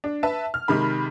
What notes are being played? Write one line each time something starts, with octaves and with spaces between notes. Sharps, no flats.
D4
B4 E5 A5
F6
C3 D#3 G#3 B5